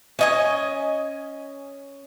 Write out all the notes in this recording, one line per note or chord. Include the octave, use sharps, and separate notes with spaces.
C#4 D#5 G#5